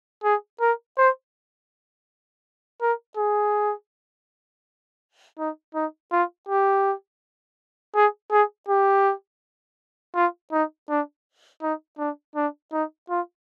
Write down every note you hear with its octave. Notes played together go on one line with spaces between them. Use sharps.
G#4
A#4
C5
A#4
G#4
D#4
D#4
F4
G4
G#4
G#4
G4
F4
D#4
D4
D#4
D4
D4
D#4
F4